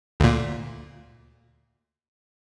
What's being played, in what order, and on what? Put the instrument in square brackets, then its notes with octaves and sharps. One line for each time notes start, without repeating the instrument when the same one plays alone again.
[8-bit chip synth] D2 A#2